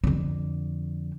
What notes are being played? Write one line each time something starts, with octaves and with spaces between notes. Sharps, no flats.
F2 D3